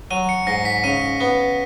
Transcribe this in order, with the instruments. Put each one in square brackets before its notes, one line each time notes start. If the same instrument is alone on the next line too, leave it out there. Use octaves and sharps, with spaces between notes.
[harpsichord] F#3 [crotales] D#7
[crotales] C#7
[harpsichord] G#2 [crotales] A#6
[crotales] B6
[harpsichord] C#3 [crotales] D#7
[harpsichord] B3